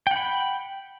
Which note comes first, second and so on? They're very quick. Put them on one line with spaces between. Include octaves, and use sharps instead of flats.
G5 F#5 B5